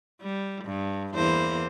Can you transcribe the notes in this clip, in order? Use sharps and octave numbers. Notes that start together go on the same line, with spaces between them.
G3
G2
E2 A#3 C5